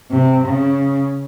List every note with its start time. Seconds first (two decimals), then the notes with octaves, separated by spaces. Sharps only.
0.11 C3
0.47 C#3